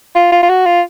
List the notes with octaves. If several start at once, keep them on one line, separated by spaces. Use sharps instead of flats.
F4
F4
F4
F#4
F4